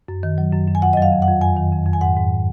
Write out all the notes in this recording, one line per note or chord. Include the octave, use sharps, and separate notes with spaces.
F#2
D#3
F#3
F#2
F#2
G#5
F2 F#5
D#5
F#3 F5
F2
F#5
F2
F2 G#5
D#3
F2
F2
G#5
G#2 F#5
G#2